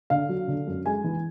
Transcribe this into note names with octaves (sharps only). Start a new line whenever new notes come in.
D3 F5
F#3
D3
F#2
G#3 G#5
E3